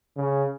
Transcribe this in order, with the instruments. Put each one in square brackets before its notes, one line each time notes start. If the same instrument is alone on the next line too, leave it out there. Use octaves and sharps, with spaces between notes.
[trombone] C#3